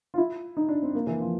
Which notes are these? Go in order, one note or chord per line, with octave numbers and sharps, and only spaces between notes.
F4
E4
D#4
D4
C4
A#3
E3
F3